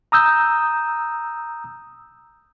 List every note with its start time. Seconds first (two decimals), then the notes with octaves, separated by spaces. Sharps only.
0.12 A#5 D#6 E6 G6